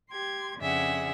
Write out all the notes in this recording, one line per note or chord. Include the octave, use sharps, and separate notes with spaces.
G4 C6 G#6
F2 C#3 D4 G#4 E5 F#5